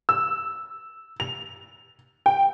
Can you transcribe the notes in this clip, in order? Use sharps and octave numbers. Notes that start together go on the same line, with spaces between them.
E6
F7
G5